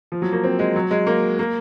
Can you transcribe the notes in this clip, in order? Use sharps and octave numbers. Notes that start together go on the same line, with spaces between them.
F3
F#3
A#3
C4
G#3
F#3
G#3
A#3
A#3